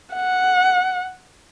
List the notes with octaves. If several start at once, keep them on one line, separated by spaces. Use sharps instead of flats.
F#5